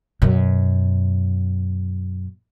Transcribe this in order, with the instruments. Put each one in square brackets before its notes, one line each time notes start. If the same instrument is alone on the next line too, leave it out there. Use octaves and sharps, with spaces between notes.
[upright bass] F#2 B2